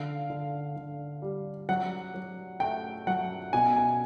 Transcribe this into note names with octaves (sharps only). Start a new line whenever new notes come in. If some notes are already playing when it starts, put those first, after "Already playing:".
Already playing: D3 F5
D3
D3
G3
F#3 F#5
F#3
A3 G5
F#3 F#5
B2 G#5
G#5